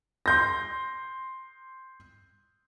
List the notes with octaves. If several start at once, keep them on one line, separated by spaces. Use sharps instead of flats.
C6 G6 A#6